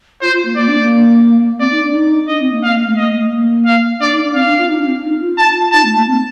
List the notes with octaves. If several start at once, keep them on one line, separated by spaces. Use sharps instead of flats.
F4 C5
F4
A#3
A#3 D5
D4
A#3
C4 D5
D#4
D4
D#4
D4 D#5
C4
A#3
A#3 F5
A#3
A3
A#3 D#5
A3
A#3
F5
D4 D5
D#4
D4
C4 F5
D4
F4
D#4
D4
C4
D#4
F4
A5
D#4 A5
A3
A#3
C4